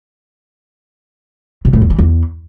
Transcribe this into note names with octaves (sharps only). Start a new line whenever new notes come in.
B2
A2
E2
E3
E2